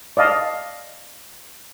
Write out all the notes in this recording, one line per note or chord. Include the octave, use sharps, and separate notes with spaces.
D5 D#5 F5 A5